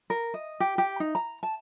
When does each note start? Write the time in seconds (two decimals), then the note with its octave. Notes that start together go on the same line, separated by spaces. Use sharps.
0.10 A#4
0.34 D#5
0.60 G4
0.78 G4
1.00 D#4
1.15 A#5
1.43 A5